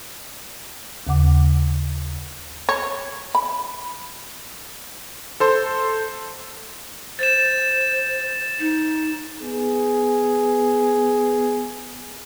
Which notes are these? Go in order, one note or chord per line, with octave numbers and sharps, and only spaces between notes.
D#2 C#3 F#5 D6
C#5
B5
A4 C5 C6
C5 A6 E7
D#4
B3 G#4